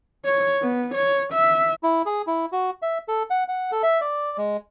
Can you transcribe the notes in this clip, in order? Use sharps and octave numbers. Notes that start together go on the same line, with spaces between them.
C#5
B3
C#5
E5
E4
G#4
E4
F#4
E5
A4
F#5
F#5
A4
E5
D5
G#3